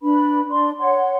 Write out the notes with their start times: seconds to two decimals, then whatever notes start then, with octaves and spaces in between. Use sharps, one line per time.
0.01 D4 B4 B5
0.50 D4 D5 C6
0.79 C#5 F#5 C6